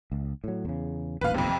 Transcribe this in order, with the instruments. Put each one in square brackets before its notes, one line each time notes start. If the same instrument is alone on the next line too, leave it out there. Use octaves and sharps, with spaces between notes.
[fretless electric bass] C#2
A2 F#3
E2 C#3
[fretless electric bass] D#1 A1 D#2 [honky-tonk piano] B4 F5
[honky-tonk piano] F2 C3